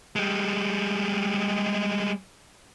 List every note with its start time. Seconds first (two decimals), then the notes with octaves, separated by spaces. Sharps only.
0.16 G3 G#3